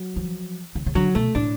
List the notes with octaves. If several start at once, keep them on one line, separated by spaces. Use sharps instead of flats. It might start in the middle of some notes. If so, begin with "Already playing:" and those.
Already playing: F#3
F3
C#3
C#3
D3 F#3
B2 A3
A2 D4